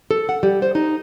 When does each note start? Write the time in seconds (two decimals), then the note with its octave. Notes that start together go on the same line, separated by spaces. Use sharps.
0.11 A4
0.29 F#5
0.43 G3
0.62 C5
0.75 D#4